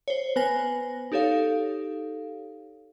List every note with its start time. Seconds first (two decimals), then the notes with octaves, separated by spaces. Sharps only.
0.08 C5 C#5
0.36 B3 B4 C5 G#5 A#6
1.12 D#4 G4 A4 C#5 F5